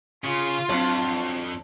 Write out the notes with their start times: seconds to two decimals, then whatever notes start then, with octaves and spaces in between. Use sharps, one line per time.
0.24 C#3 F4
0.69 F2 F#3 C4 D4